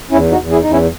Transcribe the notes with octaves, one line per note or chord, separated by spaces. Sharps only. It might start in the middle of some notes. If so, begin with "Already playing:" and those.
E2 C#4 E4
D#4 F#4
E2
E4 G#4
E2 D#4
C#4 E4